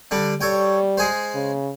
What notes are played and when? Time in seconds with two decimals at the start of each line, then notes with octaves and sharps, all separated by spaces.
0.11 D3 G3 D4
0.41 G3 A4 C#5 G5
0.97 G#3 G#4 C5
1.35 C#3